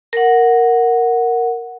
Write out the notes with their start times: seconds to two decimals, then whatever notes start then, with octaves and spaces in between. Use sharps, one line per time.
0.13 A#4 F#5